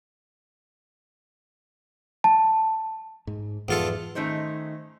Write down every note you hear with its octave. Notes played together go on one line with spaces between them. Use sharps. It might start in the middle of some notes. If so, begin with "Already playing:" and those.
A5
G#2
E2 G#2 E3 F3 F4 A4
D#3 A3 C#4 D#4 C5